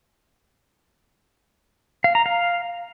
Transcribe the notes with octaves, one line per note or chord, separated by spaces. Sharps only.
F5
A#5
F5